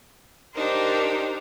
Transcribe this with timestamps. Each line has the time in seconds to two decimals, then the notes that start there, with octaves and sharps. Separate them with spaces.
0.53 D4 D#4 G4 A#4 C5